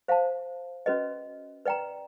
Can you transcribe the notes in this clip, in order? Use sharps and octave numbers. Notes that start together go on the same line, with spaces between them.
C5 F5 A5
C#4 F#4 B4 D#5
B4 D5 G5 A#5